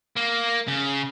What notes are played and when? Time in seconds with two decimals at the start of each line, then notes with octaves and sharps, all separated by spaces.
0.17 A#3
0.68 C#3